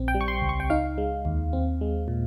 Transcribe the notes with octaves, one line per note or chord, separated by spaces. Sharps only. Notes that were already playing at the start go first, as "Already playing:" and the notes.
Already playing: A#1 C4
G5
G3
C#6
C6
C#2
C#6
G5
D#4 F5
G#3
D#2
C4
G#3
A#2